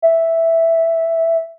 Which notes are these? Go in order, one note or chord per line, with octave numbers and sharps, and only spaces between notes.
E5